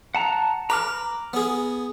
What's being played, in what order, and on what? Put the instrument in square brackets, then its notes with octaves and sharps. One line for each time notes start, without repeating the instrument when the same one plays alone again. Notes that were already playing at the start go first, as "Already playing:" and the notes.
[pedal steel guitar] F#5 A5 A#5
[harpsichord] B4 [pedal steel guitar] A#5 D6 F6
[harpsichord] B3 G#4